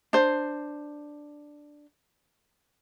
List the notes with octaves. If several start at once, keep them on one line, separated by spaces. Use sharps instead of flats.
D4 C5